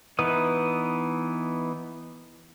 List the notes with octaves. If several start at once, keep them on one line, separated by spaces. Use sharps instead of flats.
E3 B3 D#4 B4 D#6